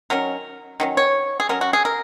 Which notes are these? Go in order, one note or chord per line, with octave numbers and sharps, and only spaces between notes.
D#3 F#3 C#4 A#4
D#3 F#3 C#4
C#5
G#4
F#3 C#4 A#4
F#4
G#4
A#4